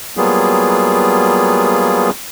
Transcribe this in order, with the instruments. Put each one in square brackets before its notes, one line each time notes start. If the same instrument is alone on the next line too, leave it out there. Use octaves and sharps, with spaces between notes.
[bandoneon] F#3 G3 A#3 B3 F4 G#4